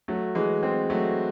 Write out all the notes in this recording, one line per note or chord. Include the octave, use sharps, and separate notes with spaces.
F#3 A3
E3 G#3
G#3 C4
F#3 A3